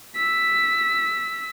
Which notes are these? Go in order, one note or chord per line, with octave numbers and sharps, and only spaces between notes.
E6 B6